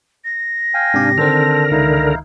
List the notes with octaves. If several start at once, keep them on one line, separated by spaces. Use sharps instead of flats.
A#6
F5 G5 G#5
G#2 C3 D4 G4
D3 D#3 C4 A4 A#4 C5 A5
C#2 D#3 D#4 E4 F5